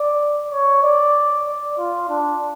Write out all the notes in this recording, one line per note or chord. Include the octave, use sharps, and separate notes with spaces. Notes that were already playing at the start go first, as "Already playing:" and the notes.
Already playing: D5
C#5
D5
D5
F4
D4